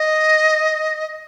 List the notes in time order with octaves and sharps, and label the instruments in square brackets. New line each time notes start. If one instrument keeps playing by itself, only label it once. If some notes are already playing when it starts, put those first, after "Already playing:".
Already playing: [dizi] D#5